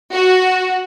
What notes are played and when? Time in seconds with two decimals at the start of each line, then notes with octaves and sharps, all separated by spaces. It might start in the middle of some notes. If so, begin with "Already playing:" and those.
0.12 F#4